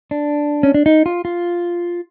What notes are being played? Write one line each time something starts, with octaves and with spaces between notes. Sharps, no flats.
D4
C#4
D4
D#4
F4
F4